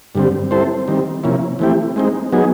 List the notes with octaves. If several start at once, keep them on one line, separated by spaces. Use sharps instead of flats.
G2 D3 G3 C4
G3 C4 E4 A4 C5
D#3 G3 C4
C3 F3 A#3 C#4 E4
E3 A3 C4 E4 G4
G#3 C4 D#4
F#3 B3 D#4 G#4